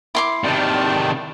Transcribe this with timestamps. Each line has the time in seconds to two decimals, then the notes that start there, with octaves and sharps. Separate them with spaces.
0.15 E4 C6 D6
0.44 C3 D#3 D5 G5 A5